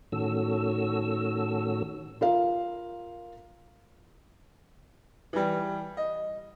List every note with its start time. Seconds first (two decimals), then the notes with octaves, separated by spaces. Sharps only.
0.12 A2 D#3 C#4 F#4 A4 E6
2.21 F4 A#4 F5
5.33 E3 G3
5.97 D#5